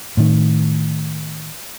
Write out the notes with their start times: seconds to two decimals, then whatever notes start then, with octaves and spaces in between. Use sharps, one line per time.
0.17 A2 D#3